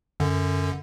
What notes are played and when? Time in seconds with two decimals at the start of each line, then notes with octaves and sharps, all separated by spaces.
0.20 F#2 D3